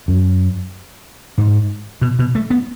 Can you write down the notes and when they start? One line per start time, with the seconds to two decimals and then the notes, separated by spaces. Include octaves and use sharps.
0.08 F#2
1.38 G#2
2.01 B2
2.19 B2
2.35 A3
2.50 B3